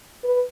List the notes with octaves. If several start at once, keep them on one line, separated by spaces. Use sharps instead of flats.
B4